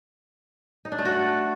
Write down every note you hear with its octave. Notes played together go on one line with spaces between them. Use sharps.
D#4
D4
A3
F#4
A4